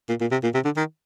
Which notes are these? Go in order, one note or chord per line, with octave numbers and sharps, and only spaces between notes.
A#2
A#2
C3
A#2
C3
D3
D#3